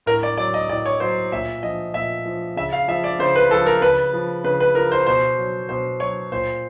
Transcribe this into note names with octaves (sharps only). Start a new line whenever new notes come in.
A2 A#4
D5
F#3 D5
D#5
A2 D5
C#5
F#3 C5
A#2 E5
F3 D#5
A#2 E5
F3
C#3 E5
F5
F3 E5
D5
C#3 C5
B4
F3 A4
A#4
C#3 B4
F3
C#3 B4
B4
F3 A#4
C5
B2 C5
F#3
B2 C5
F#3 C#5
A#2 C5